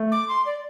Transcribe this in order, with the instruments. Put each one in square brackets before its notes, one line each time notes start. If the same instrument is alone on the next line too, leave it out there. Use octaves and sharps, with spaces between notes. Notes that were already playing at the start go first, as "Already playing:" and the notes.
Already playing: [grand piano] A3
[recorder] D6
C6
D5